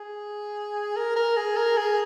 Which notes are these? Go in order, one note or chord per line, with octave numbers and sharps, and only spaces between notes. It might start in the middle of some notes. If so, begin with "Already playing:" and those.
Already playing: G#4
A#4
A#4
G#4
A#4
G#4